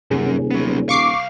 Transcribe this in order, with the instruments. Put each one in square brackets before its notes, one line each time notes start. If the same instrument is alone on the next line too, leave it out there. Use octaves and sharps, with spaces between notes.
[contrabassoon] D#1 [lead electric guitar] F#2 [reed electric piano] C3 C#4 G#4
[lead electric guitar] F#3 B3
[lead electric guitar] C2 F5 [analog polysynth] C#6 D6 C7